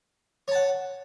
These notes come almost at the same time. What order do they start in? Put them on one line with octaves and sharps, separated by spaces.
C#5 A5 F#5